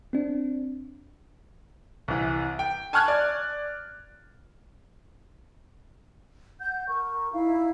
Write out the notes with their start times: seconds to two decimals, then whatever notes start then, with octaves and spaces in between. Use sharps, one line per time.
0.13 C4 D4
2.08 C2 E3
2.59 G5
2.93 G#5 A5 C#6 F6 F#6 G#6
3.08 D5
6.60 F#5 G6
6.89 A#4 C#6
7.32 D#4 E4 F5